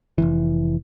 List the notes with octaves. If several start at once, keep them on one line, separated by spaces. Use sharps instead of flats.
F1 B1 E3